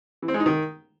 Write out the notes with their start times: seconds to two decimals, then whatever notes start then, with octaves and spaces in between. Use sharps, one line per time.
0.22 E3
0.28 C4
0.34 G#3
0.40 D#4
0.46 D#3